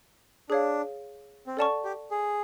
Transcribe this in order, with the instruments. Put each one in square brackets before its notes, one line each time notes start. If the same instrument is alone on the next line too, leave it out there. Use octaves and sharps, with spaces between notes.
[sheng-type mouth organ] D4 [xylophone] G#4 C#5 F5
[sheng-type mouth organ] C4
[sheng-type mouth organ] C#4 [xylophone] A4 D5 F#5 A5 C#6
[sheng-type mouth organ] G4
G#4